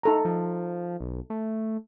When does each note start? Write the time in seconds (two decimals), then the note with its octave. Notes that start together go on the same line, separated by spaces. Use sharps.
0.03 D#4 A4 A#5
0.25 F3
1.00 B1
1.30 A3